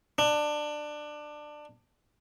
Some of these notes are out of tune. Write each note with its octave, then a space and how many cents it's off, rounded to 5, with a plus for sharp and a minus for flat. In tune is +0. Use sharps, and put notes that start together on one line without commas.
D4 +20